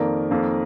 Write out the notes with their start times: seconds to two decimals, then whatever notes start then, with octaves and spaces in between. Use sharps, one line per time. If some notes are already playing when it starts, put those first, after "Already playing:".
Already playing: F2 D#3 A#3 A#4 D5
0.31 F2 D#3 A#3